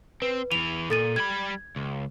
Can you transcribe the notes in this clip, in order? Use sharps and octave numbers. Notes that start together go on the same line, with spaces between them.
C4 B4
E2 E3 F7
A#2 A4 A6 D#7
G3 B5 G#6
C#2